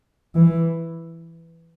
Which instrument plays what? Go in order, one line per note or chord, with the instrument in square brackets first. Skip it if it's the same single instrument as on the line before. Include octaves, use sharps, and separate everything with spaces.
[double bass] E3